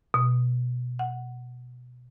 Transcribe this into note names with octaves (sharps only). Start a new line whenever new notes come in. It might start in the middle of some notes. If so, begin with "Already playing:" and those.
B2
F#5